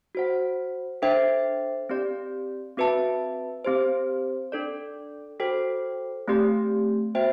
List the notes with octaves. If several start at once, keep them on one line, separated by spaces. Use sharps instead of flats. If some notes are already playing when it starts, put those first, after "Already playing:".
F#4 C5 F#5
D4 A4 C5 E5 G5
C4 G4 D5
C4 F#4 B4 E5 A5
C4 G4 C5
D4 A4 D5
F#4 A4 C5 G5
A3 C4 G4 D5
B3 F#4 C5 E5 G5